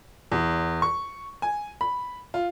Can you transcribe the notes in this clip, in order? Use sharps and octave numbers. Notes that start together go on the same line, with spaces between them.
E2
C#6
G#5
B5
F4